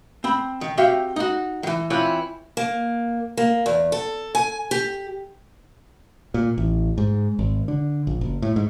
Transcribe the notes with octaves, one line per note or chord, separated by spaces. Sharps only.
C4 B5
D#3
C4 F#4 G4 E5 F5 G5
D#4 F#4
D#3 E3
E3 C4 E4 F4 B4 C#5
A#3
A#3
E2
A4
G#5
G4
A#2
A1
G#2
G#1
D3
A#1
F#1
A2
G#2